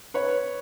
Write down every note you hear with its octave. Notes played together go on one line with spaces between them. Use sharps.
B4 C#5